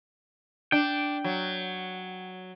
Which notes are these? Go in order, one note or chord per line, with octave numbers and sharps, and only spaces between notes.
D4 G5
F#3